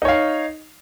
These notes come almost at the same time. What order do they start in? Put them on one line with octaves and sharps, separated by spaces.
D#4 C#5 F5